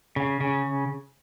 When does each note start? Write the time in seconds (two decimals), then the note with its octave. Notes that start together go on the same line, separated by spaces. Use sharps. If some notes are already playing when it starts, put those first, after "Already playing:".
0.16 C#3
0.41 C#3